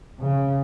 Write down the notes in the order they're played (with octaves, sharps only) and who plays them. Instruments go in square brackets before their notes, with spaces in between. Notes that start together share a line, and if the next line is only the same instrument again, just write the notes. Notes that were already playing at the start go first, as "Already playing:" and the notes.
[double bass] C#3